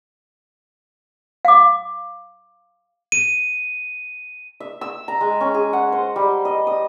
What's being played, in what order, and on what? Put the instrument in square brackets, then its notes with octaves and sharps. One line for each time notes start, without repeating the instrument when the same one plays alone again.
[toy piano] F5 D6
[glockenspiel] D#7
[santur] E5
E6
A#5
G#3
C#4
G#4
F#5
C5
G3
D#5
D#6